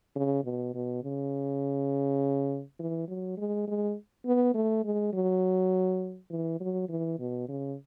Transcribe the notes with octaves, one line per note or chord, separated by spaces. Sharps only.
C#3
B2
B2
C#3
E3
F#3
G#3
G#3
B3
A3
G#3
F#3
E3
F#3
E3
B2
C#3